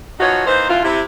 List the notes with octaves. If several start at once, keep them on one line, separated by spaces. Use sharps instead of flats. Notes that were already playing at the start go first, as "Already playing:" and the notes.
E3 F3 D#4 F4 F#4 C#5
E3 A#3 D#4 C5
F#2 B2 E4 F4
C3 E4